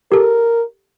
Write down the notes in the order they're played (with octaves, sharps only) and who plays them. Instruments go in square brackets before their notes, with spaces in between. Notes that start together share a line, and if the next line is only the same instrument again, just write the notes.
[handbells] G4 A4 [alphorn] A#4